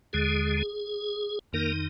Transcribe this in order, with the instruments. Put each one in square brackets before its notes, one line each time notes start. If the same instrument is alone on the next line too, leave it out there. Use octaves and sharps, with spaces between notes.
[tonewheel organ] D#2 D3 G#3 G#4
F2 D#3 A#3 D#4 A#4